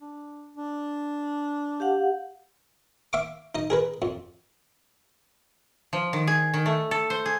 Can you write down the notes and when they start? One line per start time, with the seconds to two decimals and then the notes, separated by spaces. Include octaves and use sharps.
0.01 D4
0.57 D4
1.80 G4 F5 F#5
3.13 E5 F5 C#6 D6
3.55 D#4 D#5
3.70 G#4 A#4 B4
4.02 F2
5.93 F3
6.13 D#3
6.27 G#4
6.54 D#3
6.66 A3
6.91 A4
7.10 C5
7.26 G#4